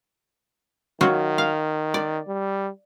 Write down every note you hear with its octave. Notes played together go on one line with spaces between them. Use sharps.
D#3 F#3 F4 F#4
F5
D5
G3